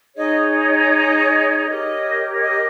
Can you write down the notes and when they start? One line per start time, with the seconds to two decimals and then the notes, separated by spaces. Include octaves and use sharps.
0.17 D#4 G#4 C#5 D#5
0.54 D#5
0.91 D#5
1.67 G4 A#4 C#5 D#5
2.34 C#5
2.42 D#5